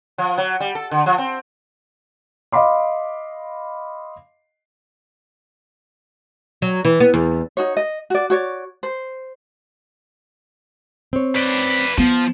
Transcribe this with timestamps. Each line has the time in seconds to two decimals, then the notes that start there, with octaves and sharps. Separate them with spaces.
0.18 F3
0.38 F#3
0.60 G3
0.75 A4
0.91 D3
1.06 F3
1.18 C4
2.52 D#5 F5 B5 C6 D6
6.62 F#3
6.85 E3
7.00 B3
7.14 E2
7.57 D#4 F#4 C#5
7.77 D#5
8.10 F#4 D5
8.30 F#4 C#5 D5
8.83 C5
11.13 C4 C#5
11.36 B4 D5
11.98 F3 B3